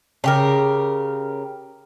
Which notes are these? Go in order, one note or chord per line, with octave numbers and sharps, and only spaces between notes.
C#3 G4 A#4